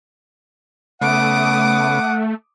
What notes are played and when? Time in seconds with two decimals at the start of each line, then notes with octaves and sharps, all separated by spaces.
1.02 C#3 A3 B3 F#5 D6 D#6